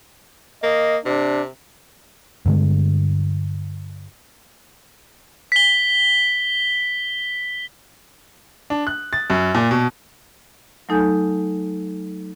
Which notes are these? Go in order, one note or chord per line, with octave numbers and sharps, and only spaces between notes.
A#3 D#5
C3 D4
G2 D3 G#3
B6 G7
D4
F#6
A6
F#2
A#2
B2
F#3 A3 D#4 A4 G#5 G6